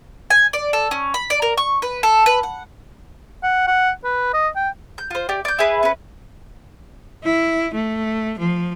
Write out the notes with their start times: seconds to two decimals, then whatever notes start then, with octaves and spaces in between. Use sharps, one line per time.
0.30 G#5
0.53 D5
0.73 A4
0.91 C#4
1.14 B5
1.30 D5
1.42 A#4
1.58 C#6
1.82 B4
2.03 A4
2.26 B4
2.43 F#5
3.43 F#5
3.67 F#5
4.04 B4
4.33 D#5
4.56 G5
4.98 G6
5.11 F4 C5
5.29 G4 D5
5.45 D5 G6
5.59 E4 G#4 B4
5.83 C#4 B4
7.24 E4
7.74 A3
8.39 F3